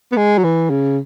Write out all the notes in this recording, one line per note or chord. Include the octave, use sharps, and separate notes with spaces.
B3
G#3
F#3
E3
C#3